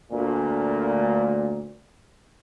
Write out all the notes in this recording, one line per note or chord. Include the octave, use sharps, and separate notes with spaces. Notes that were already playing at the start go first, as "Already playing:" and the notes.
D2 A#2